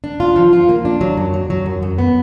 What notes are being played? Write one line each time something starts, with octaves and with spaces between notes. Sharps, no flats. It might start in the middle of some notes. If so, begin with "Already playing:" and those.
D4
F4
F3
F4
A#3
D4
F#3
F#2
F#3
F#3
F#2
F#2
B3